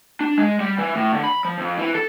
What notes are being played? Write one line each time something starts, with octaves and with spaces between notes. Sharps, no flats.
D4
G#3
G3
E3
A2
D3
B5
F3
F2
E3
A4